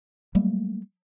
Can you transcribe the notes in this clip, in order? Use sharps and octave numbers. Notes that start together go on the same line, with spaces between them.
F#3 G3 A3 A#3